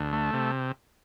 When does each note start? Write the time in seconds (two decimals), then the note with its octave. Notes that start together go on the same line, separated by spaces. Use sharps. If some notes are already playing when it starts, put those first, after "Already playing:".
Already playing: D2
0.13 A3
0.33 C3